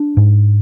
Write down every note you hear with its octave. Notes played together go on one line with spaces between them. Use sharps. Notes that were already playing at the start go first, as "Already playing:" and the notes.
Already playing: D4
G#2